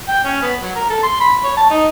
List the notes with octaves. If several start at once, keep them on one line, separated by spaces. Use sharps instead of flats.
G5
C#4
B3
F#3
A#4
A4
C6
B5
C#5
A5
D#4